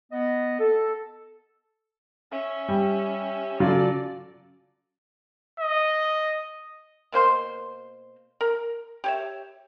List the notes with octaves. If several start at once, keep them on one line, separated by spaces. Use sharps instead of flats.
B3 D#5
A4
C#4 E5
G3
C#3 F#3 F4 A4 D5
D#5
B2 A#3 C5 C6
A#4
G4 C#5 E5